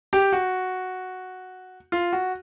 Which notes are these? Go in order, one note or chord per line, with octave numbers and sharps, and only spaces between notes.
G4
F#4
F4
F#4